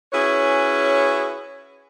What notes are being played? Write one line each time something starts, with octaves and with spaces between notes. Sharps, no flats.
C#4 E4 F#4 G#4 B4 C#5